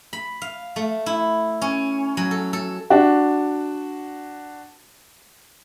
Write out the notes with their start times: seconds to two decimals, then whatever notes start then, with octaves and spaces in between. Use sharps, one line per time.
0.13 B5
0.42 F5
0.76 A3
1.06 E4
1.62 C#4
2.17 F#3
2.31 A4
2.53 A4
2.90 D4 F#4